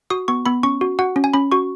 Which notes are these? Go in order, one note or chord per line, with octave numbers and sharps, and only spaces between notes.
F#4 D#6
B3 C#6
B3 B5
C#4 C#6
F#4
F#4 F#5
C#4
G#5
C#4 B5
F#4 C#6